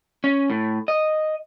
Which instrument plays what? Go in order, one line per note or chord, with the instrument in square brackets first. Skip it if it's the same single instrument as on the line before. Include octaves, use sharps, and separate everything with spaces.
[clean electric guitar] C#4
A2
D#5